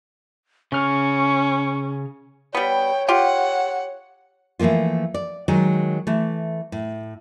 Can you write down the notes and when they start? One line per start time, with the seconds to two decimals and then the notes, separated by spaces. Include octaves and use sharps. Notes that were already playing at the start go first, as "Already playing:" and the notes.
0.72 C#3 C#4 C#6 F6
2.55 G3 B3 C#5 G5
3.09 F4 G4 F#5
4.59 E3 F3 A3 A#3 F4
5.14 D5
5.48 D#3 F#3 G#3
6.07 E3 A3
6.72 A2